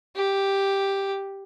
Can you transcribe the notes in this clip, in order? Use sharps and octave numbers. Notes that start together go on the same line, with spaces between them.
G4